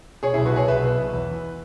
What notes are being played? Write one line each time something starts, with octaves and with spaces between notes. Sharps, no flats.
B2 G#4 C#5
B1 E4 G#4
F#4 B4
B2 G#4 C#5
B1 B4 E5
B2
B1
E2
E3